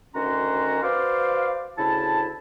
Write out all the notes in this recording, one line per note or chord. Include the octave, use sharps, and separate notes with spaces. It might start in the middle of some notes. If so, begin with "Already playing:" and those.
D2 D#3 C#4 F#4 A#5 C6
F#4 B4 C5 D5 F5
D2 C#3 E4 A5